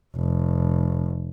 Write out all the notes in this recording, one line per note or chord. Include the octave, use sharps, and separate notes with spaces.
F1